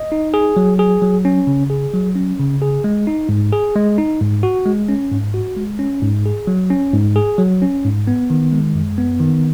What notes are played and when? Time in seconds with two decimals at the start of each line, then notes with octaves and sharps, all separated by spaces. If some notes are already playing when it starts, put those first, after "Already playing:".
Already playing: D#5
0.12 D#4
0.34 G#4
0.57 F#3
0.79 G#4
1.02 F#3
1.25 C#4
1.47 C#3
1.70 G#4
1.94 F#3
2.16 C#4
2.39 C#3
2.62 G#4
2.84 G#3
3.07 D#4
3.29 G#2
3.53 G#4
3.75 G#3
3.98 D#4
4.21 G#2
4.43 F#4
4.66 G#3
4.89 C#4
5.12 G#2
5.34 F#4
5.57 G#3
5.79 C#4
6.02 G#2
6.26 G#4
6.47 F#3
6.70 C#4
6.94 G#2
7.16 G#4
7.38 F#3
7.62 C#4
7.84 G#2
8.07 B3
8.30 D#3
8.52 G#3
8.75 F#2
8.98 B3
9.20 D#3